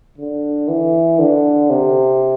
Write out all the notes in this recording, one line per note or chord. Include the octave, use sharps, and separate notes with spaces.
D3
E3
D3
C3